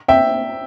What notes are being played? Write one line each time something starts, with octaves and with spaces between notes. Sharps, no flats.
E5 G5